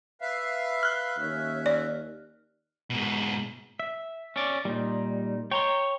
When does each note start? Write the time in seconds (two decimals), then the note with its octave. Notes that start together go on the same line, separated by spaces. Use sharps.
0.21 B4 E5 F5
0.83 F6 F#6
1.18 D#2 C#4 E5
1.66 D5
2.90 G#2 B2
3.80 E5
4.36 C#4 D5
4.65 A#2 G3 D#4
5.51 C#5 G5 A#5 C6